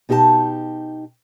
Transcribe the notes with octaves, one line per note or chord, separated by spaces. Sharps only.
B2 D#4 G4 C5 A5